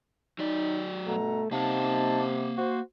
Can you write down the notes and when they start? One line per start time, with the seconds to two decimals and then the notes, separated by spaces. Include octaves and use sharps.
0.39 F#3 D#4 D5
1.07 G2 B2 A3 A#5
1.51 C3 A#3 D#4 F5 F#5 A5
2.57 F#4 C5